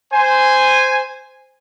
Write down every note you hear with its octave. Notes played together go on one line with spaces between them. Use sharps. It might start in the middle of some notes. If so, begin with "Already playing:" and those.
C5 G#5